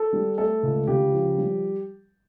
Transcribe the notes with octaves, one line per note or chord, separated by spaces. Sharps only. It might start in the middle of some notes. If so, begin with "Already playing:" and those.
Already playing: A4
G3
A3 A4
C#2
C#3 G4
F3
G3